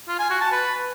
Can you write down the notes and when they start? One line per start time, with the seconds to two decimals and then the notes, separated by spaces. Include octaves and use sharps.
0.08 F4
0.19 G#5
0.30 F#4
0.41 A5
0.52 B4